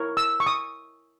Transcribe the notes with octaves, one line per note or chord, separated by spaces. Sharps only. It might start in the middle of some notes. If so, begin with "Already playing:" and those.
Already playing: E4 A#4 C#5
E6
C#6
D#6